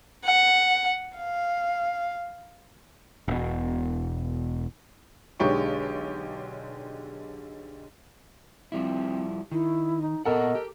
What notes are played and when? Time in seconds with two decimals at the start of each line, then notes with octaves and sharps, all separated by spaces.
0.24 F#5
1.17 F5
3.28 E1 B2
5.40 B1 D3 G#3 G4 C#5 C#6
8.72 F3 G3 C4 E4
9.52 D#3 E4
10.01 D#4
10.25 A#2 B3 A4 A#4 D#5 F#5
10.55 G4